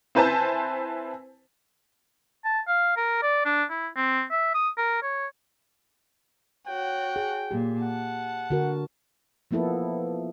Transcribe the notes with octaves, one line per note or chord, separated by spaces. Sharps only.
C4 E4 B4 C5 G#5 A5
A5
F5
A#4
D5
D4
E4
C4
E5
D#6
A#4
C#5
F#4 C#5 F#5 G5
G#4
A#2 G4
F#5 A5
D3 F#4 A#4
F3 A#3 B3 E4 A4